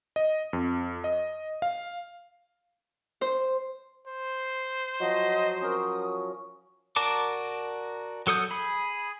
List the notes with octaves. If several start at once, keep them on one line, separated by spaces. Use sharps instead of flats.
D#5
F2
D#5
F5
C5
C5
F3 F#3 D#5
C#4 A#4 D#6
F#4 A#4 D5 A5 D6
F#3 A4 D#6 G6
G#4 B5